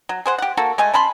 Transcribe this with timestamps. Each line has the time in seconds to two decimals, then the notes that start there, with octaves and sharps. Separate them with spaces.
0.09 F#3
0.26 G#4 C5 F#5
0.38 G4 F#5
0.57 A#3 F#4 A4
0.78 G#3 A3 G#5
0.93 C#4 A5 B5 C6